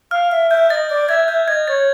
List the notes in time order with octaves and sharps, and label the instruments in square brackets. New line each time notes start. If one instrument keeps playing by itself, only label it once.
[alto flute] F5 [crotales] F6
[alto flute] E5 [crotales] F6
[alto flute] E5 [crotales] G6
[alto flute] D#5 [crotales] A6
[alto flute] D5 [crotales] A6
[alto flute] E5 [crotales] G#6
[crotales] G#6
[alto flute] E5 [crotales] G6
[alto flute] D#5 [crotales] G#6
[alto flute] C#5 [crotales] A6